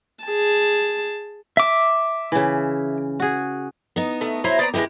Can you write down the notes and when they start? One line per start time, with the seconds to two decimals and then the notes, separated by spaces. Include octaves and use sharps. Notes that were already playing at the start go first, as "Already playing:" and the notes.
0.24 G#4 A5
1.57 E5 D6
2.32 C#3 E3
3.20 F#4 G#4
3.96 B3 D#4
4.21 A3
4.44 F#3 E4 C5 A#5
4.59 B3 D5 A#5
4.74 D#3 F#3 G#3 B3 E4 G4